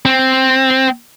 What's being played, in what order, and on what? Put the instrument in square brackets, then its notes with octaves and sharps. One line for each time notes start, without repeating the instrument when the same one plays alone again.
[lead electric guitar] C4